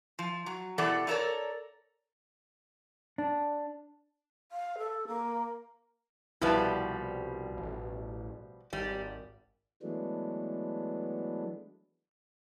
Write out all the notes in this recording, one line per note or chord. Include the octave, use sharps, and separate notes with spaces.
F3
F#3
B2 E3 G4 A4 D5 F#5
D#4 E4 A4 A#4 C#5 D5
D4
F5
A4
A#3
C2 B2 F3 G3 E4 B4 A5
A1
G#1 G3
E3 F#3 G#3 A3 B3 D4